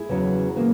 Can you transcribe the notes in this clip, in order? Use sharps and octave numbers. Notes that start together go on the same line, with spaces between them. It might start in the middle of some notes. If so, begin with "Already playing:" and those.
Already playing: E4 G#4
E2 C#3 F#3 C#4
C#3 E3 A#3